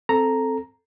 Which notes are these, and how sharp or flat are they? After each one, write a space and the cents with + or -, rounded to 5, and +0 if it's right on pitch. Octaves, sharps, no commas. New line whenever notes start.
C4 +0 A4 +0 A#5 +0